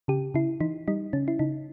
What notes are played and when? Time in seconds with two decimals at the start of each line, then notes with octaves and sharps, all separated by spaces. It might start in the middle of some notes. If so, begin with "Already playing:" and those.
0.08 C#3 G4
0.34 C#3 E4
0.60 E3 D#4
0.88 G3 D#4
1.13 C#3 C#4
1.28 E4
1.39 C#3 D#4